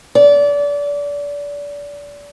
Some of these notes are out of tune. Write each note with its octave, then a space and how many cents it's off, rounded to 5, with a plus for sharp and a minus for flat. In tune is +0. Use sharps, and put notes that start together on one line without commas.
D5 -30